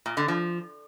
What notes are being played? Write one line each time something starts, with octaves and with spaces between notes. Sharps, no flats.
A#2
D3
F3